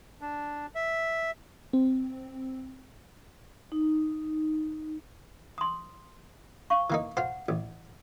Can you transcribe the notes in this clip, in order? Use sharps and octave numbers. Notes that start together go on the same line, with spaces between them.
D4
E5
C4
D#4
C6 D#6
F5 C#6
E3 A#3 D#4
F4 C5 F#5
A1